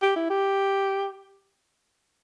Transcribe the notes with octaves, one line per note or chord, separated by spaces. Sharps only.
G4
E4
G4